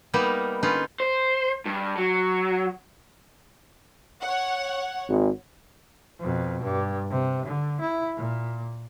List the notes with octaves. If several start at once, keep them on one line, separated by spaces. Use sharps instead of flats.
G3 A#3 B3 D#4 A#4 B4
D3 C#4 D#4 F4 B4
C5
G2
F#3
C#5 F#5
G#1
F2 B2
G2
C3
D3
E4
A#2